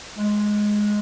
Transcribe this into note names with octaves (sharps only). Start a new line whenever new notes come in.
G#3